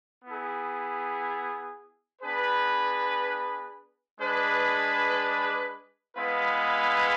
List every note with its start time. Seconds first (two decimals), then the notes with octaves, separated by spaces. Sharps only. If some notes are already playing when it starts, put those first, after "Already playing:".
0.25 B3 E4 G#4
2.21 B3 D4 G#4 B4
4.19 G#3 D4 G#4 B4
6.15 G#3 B3 E4 B4 F5